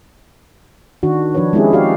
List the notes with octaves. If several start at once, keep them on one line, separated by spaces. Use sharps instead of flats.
D#3 D4 F#4
F3 D4 F#4 B4 C#5
G#3 C4 C#4 E4 G4 G#4
F#4 G4 D5 F5